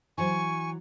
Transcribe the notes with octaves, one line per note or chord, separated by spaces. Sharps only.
E3 F#3 C5 G#5 C#6